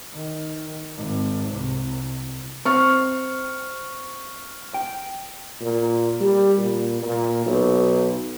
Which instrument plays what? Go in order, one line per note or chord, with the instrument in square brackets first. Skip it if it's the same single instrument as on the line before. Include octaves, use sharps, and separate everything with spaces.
[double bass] D#3
G#1
C2
[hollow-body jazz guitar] C4 [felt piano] C#6 F6
[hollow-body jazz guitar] G5
[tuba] A#2
G3
A#2
A#2
B1